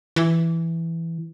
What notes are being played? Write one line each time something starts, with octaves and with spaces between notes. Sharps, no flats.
E3